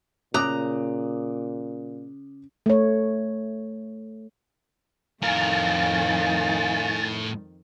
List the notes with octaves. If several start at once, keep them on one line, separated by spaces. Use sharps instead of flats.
A#2 C#3 A#5 D6 D#6 F#6
A3 C#5
F2 A2 D#3 A#4 F5 G#5 A6